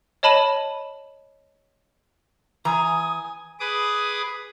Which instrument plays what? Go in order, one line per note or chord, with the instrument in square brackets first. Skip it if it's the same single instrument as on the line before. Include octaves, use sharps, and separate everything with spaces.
[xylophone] C#5 D#5 A5 B5 D#7 E7
[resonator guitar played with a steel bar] E3 A#5 [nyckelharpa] G#5 [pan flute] D#6
[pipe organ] G#4 B4 D6 D#6